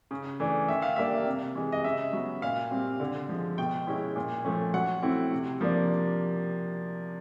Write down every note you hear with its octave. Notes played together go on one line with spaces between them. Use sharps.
C#3
E3 A3 D4
D#3 E5
F5
G3 A#3 D4 E5
C3
E3 G#3
D#5
C#3 E5
F#3 B3
A#2 F5
G3 C4
D3
F3 G#3
B2 G5
G#3 C#4 E4
A#2
F3 A3 C#4
F#3 F#5
A3 C4 E4
C3
F3 A#3 D4